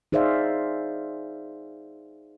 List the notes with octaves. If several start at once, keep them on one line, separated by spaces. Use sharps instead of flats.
D#4 G#4 C5 D5 E5 F5